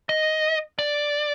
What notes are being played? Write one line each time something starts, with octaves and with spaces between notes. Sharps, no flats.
D#5
D5